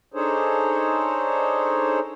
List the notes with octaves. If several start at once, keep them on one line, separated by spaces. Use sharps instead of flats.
D4 D#4 G#4 A4 C5 C#5